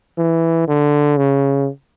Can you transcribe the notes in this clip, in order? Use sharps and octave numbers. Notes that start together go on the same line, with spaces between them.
E3
D3
C#3